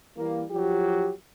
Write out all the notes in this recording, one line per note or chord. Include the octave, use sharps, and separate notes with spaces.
E3 G3 A#3
F3 F#3 G4